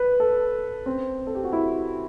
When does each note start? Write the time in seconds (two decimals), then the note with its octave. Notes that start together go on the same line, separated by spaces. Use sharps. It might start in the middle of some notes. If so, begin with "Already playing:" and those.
Already playing: B4
0.20 A4
0.86 C4
1.27 A4
1.35 G4
1.44 F#4
1.53 E4